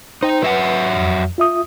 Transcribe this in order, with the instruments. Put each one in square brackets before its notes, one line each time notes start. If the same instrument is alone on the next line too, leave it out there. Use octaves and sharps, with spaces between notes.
[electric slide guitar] D#4 [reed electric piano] C5 G5
[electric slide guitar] F#3 E5 F#5 [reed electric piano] B4
[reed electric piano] F2
F4 E5 D#6